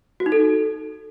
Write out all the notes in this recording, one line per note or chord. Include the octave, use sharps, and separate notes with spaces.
F#4
D#4
A4